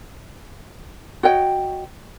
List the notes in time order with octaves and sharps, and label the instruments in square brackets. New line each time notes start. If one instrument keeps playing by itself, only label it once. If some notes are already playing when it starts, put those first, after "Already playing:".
[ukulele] F#4 C#5 D#5 G5